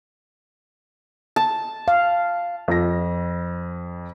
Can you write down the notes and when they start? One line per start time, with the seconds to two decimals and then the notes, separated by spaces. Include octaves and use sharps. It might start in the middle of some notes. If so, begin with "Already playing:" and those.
1.36 A5
1.88 F5
2.68 F2 A#6